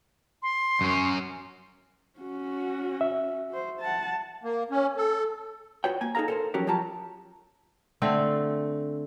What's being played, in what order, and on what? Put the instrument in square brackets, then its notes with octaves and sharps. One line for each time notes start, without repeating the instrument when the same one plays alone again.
[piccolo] C6
[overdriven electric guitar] F#2 C#4
[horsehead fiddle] C#4 F#4
[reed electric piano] E5
[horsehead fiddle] F#4 C5
F#5 A5
[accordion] A#3
C#4
A4
[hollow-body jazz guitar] F4 F#4 B4 C#5 G5
A#3 G#5
D#4 G#4 A4 F5 A#5
A4 A#4 C5
F3 F#3 C#4 F#4 G4 A#4
F3 F#3 F4 G4 A5 A#5
[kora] D3 A3 C4